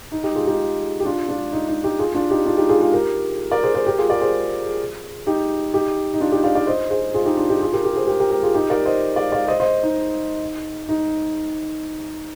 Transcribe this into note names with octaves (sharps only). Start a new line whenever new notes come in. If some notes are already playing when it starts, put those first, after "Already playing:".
D#4
D#4 G4
F4 G#4
D#4 G4
G4
D4 F4
D4 F4
D#4
D#4
D#4 G4
F4 G#4
D4 F4
D#4 G4
D4 F4
D#4 G4
F4 G#4
F4 G#4
G4 A#4
A#4 D5
G#4 C5
G#4 C5
G4 A#4
F4 G#4
A#4 D5
G#4 C5
D#4 G4
D#4 G4
D#4
D4 F4
D#4 G4
D5 F5
D5 F5
C5 D#5
G#4 C5
F4 G#4
D#4 G4
D4 F4
D#4 G4
F4 G#4
G4 A#4
G4 A#4
G#4 C5
G4 A#4
G4 A#4
G4 A#4
F4 G#4
D#4 G4
A#4 D5
C5 D#5
D5 F5
D5 F5
C5 D#5
C5 D#5
D#4
D#4